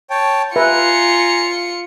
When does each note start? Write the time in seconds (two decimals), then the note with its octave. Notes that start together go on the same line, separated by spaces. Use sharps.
0.10 C#5 G5 A5
0.56 F4 G4 B4 E5 G#5 A#5 C#7